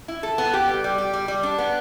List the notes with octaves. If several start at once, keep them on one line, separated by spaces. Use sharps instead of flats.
E4
A4
B3
G4
G3
G3
G4
G3
G3
D4
B3